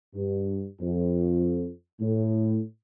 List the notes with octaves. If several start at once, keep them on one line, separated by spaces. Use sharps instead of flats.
G2
F2
A2